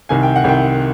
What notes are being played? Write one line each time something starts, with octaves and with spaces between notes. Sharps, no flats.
C2 C3 D#3 G#5
G5
F#5
C2 C3 D#3 G5